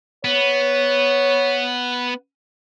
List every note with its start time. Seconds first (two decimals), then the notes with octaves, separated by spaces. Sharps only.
0.25 B3 C#5